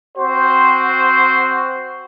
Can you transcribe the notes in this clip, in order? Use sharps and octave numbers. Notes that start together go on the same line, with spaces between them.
C4 F#4 C5